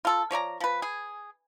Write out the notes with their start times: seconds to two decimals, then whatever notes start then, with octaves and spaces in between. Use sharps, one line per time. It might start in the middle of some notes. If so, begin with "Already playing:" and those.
0.05 F4 A4
0.31 F3 C#5 D5 A#5
0.60 F3 B4
0.82 G#4